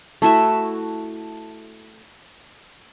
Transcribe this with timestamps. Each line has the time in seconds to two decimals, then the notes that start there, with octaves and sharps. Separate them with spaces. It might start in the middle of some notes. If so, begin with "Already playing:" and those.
0.22 A3 E4 F#4 E5